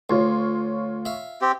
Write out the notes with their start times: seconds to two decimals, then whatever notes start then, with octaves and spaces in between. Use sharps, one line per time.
0.10 D2 F4 C#5 C6
1.05 E5 F5
1.42 C4 G4